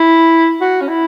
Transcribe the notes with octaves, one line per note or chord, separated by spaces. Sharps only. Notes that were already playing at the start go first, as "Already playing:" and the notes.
Already playing: E4
F#4
C#4
E4